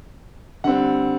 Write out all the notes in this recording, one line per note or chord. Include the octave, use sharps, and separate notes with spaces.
D3 G3 C4 F#5